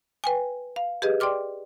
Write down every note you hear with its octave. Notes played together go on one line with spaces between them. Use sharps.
B4 G5 G#5
F5
G4 G#4 B4 D#5
D5 G5 C6 D6 F6